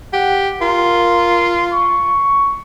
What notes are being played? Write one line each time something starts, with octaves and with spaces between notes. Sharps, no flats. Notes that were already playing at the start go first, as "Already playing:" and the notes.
G4 F#5
F4 A#4
C#6